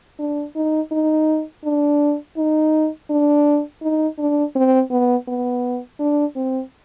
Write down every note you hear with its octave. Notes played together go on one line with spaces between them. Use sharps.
D4
D#4
D#4
D4
D#4
D4
D#4
D4
C4
B3
B3
D4
C4